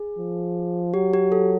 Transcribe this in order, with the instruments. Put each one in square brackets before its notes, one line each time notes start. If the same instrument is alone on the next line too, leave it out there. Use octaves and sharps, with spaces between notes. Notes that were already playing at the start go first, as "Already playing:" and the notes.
Already playing: [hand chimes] G#4
[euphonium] F3
[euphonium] F#3 [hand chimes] G4
[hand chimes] G4
A4